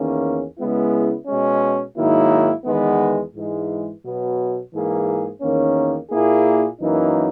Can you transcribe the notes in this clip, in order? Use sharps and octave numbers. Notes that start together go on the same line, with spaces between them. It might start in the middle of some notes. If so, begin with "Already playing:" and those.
Already playing: E2 D#3 A#3 C#4
C#3 G#3 B3 E4
B2 G#3 C#4
G#2 D#3 F#3 A#3 E4
E2 D#3 G#3 B3
G#2 E3 G#3
B2 F#3 B3
G#2 E3 A#3 E4 G#4
E2 D#3 A#3 C#4
A#2 A#3 E4 G#4
F#2 E3 A#3 D#4